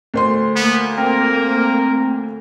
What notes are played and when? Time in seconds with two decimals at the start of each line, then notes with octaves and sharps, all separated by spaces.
0.14 D2 C5 C6
0.56 A#3 B3
0.98 C4 A#4